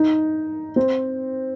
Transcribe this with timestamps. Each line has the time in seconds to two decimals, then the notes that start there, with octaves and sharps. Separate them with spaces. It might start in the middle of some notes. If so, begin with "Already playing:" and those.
Already playing: D#4
0.76 C4